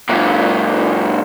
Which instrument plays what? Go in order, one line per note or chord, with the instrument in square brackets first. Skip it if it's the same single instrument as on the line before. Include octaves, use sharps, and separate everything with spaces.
[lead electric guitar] F#2 A#2